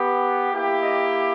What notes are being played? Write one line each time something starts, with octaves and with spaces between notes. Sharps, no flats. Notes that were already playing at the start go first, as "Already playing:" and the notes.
Already playing: B3 G4
A#3 E4 G4
D#5